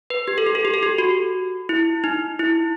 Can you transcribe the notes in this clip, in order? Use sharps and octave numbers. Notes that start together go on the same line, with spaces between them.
B4
G4
A4
G4
A4
G4
A4
G4
F#4
E4
D#4
E4